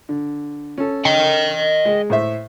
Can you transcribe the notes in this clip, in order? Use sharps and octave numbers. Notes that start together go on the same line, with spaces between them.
D3
C#4 A4
D#5 G5
G#3
A2 C5 E5